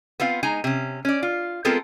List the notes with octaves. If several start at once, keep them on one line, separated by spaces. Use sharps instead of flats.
B3 C4 F4 F5
G#3 D#4 G#5 A#5
C3 C#4
C#4 D5
F4
G#3 B3 C4 F4 A4 A#4